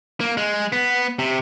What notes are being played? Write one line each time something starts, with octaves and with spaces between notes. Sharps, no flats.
A#3
G#3
B3
C3